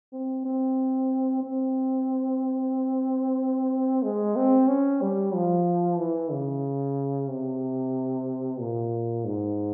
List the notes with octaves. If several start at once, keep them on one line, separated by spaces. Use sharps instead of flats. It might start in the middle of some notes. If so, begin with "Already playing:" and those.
C4
C4
C4
G#3
C4
C#4
G3
F3
E3
C#3
C3
A#2
G#2